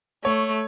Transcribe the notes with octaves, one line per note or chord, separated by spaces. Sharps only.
A3 C#5